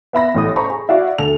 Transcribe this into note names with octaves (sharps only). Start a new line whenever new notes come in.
B3 E5 B5 A#6
A1 A2 D#6
C5 A#5 B5 C#6
G#4
E4 F#4 D5 F5
D2 A4 F7